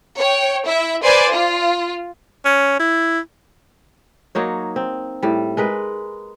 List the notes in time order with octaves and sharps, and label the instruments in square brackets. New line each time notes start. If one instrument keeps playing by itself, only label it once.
[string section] C#5 G5
E4 E5
B4 C5 D5 G#5 C6
F4
[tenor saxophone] C#4
E4
[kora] F#3 A#3 D#4 C#5
C4
A2 G3
G#3 A#4 B4